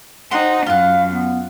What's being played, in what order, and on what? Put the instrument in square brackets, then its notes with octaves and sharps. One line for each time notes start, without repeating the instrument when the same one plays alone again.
[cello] D#4 [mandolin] F#4 F#5 C6 [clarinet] C5
[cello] F#2 [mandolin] F4 F#5 [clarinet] F5
[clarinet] B3